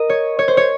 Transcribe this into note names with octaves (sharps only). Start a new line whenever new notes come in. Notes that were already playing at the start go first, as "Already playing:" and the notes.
Already playing: A#4 D#5
C#5
C#5
C5
C#5